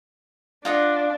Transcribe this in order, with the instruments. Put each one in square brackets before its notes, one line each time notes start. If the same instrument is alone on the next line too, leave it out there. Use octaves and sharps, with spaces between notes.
[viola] D4 [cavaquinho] F4 D#5 F#5